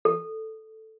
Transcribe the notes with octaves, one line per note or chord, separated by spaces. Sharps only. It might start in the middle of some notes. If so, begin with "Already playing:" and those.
A4